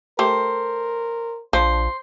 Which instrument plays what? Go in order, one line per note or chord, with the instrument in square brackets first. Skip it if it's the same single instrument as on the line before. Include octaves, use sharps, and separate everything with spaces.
[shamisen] A3 G4 [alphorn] A#4 [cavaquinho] C5
[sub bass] A#1 [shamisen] F3 [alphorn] D4 [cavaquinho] C5